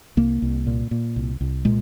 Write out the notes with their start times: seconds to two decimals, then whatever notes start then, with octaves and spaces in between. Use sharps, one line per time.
0.17 C2 A#3
0.42 C2
0.67 A#2
0.91 A#2
1.16 C2
1.41 C2
1.65 A#2 G#3